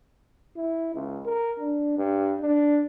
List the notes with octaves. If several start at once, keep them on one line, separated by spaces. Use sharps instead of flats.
E4
C#2
A#4
D4
G2
D4